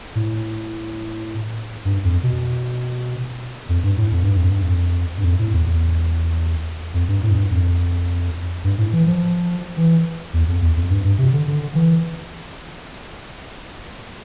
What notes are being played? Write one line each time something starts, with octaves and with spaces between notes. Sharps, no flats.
A2
G2
F2
B2
F2
G2
A2
F2
G2
F2
G2
F2
G2
F2
A2
E2
E2
F2
G2
A2
F2
G2
F2
G2
A2
E3
F3
E3
E2
F2
E2
F2
G2
G2
C3
D3
D3
E3